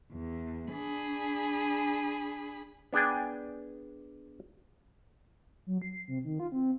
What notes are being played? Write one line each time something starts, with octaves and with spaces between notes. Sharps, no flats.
E2
D4 G#4 B5
B3 D4 G#4 G5 G#5
F#3
C7
C3
D#3
F4
C4